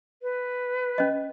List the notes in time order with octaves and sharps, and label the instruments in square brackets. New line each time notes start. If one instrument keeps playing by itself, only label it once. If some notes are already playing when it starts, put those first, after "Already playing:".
[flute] B4
[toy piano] C#4 D#5